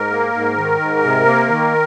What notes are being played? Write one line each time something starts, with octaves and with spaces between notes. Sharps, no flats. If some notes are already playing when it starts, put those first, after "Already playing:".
Already playing: G#2 A#4
A#3
G#2
D#3
G#2
C3
A#3
D#3